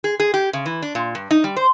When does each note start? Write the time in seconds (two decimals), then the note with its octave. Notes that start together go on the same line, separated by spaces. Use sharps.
0.04 G#4
0.20 G#4
0.34 G4
0.53 C#3
0.66 E3
0.82 D4
0.95 A#2
1.15 G2
1.31 D#4
1.44 G3
1.57 C5